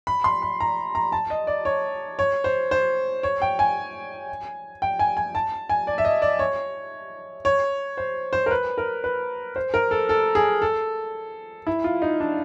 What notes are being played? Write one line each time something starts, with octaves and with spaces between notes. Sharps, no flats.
B5
C6
B5
A#5
A#5
A5
D#5
D5
C#5
C#5
C5
C5
C#5
G5
G#5
G5
G#5
G#5
A5
G#5
D5
E5
D#5
D5
C#5
C#5
C5
C5
A#4
B4
A#4
B4
C5
A#4
A4
A4
G#4
A4
E4
F4
D#4
D4